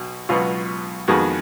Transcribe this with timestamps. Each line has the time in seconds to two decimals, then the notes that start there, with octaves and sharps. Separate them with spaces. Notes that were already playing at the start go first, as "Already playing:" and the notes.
Already playing: B1 B2 F#4
0.29 C#2 B2 F#3 B3 F4
1.08 F2 D#3 G#3 B3 F#4